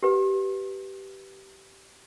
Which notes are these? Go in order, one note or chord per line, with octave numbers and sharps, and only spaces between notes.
G4 B4